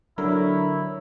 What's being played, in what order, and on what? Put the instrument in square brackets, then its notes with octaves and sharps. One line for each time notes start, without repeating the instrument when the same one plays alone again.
[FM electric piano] D3 A#4 [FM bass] F#3 [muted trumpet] E4 [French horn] C#5